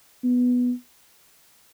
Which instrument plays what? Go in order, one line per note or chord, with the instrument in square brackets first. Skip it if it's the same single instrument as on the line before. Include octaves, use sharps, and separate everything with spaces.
[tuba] B3